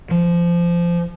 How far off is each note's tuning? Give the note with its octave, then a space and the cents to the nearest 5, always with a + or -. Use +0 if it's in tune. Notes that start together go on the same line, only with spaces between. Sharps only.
F3 -20